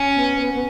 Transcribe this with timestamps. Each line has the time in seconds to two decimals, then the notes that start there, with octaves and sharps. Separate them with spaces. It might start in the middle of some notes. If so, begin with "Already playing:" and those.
Already playing: C#4
0.15 B3
0.37 B3
0.53 B3